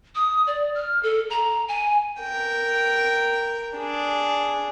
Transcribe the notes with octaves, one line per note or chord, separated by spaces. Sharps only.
D#6
D5
F6
A4
A#5
G#5
A#4 G5
D4 G#4